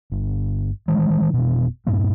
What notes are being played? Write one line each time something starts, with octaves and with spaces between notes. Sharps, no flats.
G1
D#3 E3 G#3
F1 B2
G2 A#2 A#3 C4